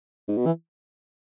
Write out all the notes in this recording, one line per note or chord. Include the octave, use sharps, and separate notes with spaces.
G#2
B2
E3